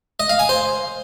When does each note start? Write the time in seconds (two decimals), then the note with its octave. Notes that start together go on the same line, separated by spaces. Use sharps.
0.20 D#5
0.29 F5
0.39 G#5
0.49 C5